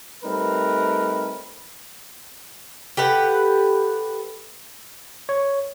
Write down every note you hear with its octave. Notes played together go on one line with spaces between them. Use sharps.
G3 A3 C4 D#4 A#4 B4
G4 A4 B4 F#5
C#5